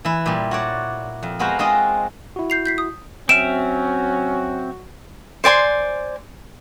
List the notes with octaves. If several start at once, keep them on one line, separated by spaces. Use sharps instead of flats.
E3 E4
A#2 G3
F#4 C#5 D5
F2
G#3 B3 F#4 A#4 C5 F5
G#3 C4 F4 F#4 G#4 D#5
E4 F#4
G6 C7 F7
G6 B6 C7
D#6
F#3 C4 C#4 F#4 E5 F6 D7 E7
C5 D5 G#5 C6